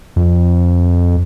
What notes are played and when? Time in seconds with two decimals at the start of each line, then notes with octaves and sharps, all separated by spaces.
0.16 F2